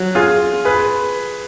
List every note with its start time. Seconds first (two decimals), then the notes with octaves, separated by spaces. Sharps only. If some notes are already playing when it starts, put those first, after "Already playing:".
Already playing: F#3
0.15 F4 G#4
0.65 G#4 B4